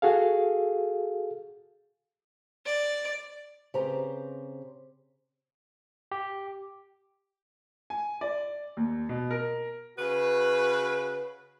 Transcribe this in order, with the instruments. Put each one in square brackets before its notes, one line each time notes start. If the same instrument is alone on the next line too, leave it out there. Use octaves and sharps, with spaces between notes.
[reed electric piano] F#4 G#4 A4 F5
[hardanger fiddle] D5
[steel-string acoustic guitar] C#3 C4 G4 B4 C5 A#5
[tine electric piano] G4
[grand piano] G#5
D5
D#2
B2
A#4
[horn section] C#3 F#4 B4